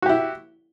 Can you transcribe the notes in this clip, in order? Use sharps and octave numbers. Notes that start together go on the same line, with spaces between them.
E4 F#4 G4